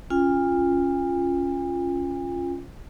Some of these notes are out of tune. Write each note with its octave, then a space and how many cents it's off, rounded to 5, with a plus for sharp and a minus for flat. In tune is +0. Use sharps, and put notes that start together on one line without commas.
C#4 +0 F4 +0 G#5 -45